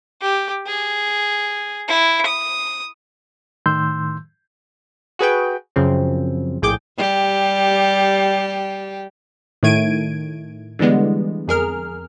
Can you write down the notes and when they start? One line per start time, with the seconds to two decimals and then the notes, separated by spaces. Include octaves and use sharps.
0.22 G4
0.67 G#4
1.88 E4
2.26 D#6
3.66 A2 D#3 C6 E6 G6
5.19 F#4 G#4 B4 G5
5.76 F#2 C#3 F3 C4
6.62 A#1 A2 G#4 G5 D6 G6
6.98 G3 G4
9.63 A2 D#3 A3 G#6 D7 D#7
10.79 D3 E3 G3 G#3 B3
11.48 F2 G#4 A#4 F6